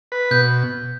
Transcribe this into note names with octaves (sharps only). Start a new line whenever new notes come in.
B4
B2 G6